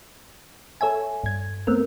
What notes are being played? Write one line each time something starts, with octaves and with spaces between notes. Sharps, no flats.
A4 C#5 E5 G#5
G2 G#6
A3 B3 C4 A#4